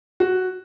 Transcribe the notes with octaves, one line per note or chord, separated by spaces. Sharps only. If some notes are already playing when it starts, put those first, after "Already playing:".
F#4